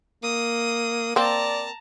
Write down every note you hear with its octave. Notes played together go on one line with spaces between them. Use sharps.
A#3 D#6
A#3 C4 D5 A5 A#5